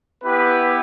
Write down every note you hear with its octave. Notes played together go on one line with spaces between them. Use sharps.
B3 E4 G4 B4